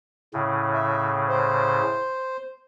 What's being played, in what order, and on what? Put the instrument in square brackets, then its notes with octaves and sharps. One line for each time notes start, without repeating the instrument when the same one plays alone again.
[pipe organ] A2 C#3
[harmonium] E5
C5